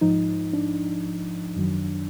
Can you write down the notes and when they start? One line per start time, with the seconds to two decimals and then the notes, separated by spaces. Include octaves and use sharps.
0.01 G#2 F3 D#4
0.53 D4
1.56 F#2 D#3 F#3